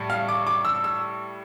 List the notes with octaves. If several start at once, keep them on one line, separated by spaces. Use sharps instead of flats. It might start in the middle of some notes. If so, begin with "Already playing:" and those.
Already playing: A2 G3
F5
D6
D6
E6
E6